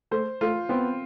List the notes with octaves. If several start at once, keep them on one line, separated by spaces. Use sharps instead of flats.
A3 C5
A3 F4
B3 C4